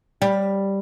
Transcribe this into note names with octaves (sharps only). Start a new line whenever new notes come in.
G3